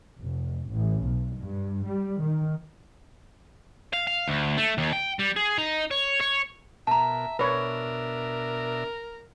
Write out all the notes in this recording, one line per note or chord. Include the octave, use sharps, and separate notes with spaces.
F1
A1
B1
G2
G3
D#3
F5
F5
D2
A3
D#2
G5
G3
G#4
D#4
C#5
C#5
B2 A#4 E5 A5 A#5
B2 D4 A#4 B4 C#5 E5